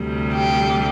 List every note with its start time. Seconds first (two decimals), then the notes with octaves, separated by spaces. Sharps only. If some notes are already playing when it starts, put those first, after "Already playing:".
Already playing: D2 C3 G3
0.33 G4